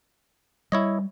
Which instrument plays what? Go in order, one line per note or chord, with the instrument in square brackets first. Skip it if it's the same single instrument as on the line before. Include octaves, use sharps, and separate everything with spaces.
[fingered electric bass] G3 [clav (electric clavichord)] E4 C#5 D#5